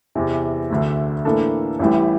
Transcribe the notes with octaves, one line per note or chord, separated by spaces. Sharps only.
E2 C3 E3
D2 D3 A3
A2 E3 A#3 D4 A4
A1 A2 E3 G3